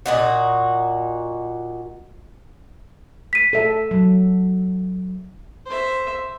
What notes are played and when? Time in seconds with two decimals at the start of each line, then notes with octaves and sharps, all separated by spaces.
0.06 A#2 D#4 F#4
3.33 B6 D#7
3.53 A4 E5
3.91 F#3
5.66 C5 E5